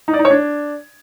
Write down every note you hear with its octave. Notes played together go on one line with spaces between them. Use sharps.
D#4
D5
D#4
C#5
D4